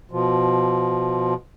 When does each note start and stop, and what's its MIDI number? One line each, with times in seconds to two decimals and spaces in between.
0.11 1.34 47
0.11 1.34 53